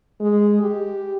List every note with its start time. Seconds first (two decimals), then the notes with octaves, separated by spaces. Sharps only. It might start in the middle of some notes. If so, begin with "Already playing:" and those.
0.20 G#3
0.62 G4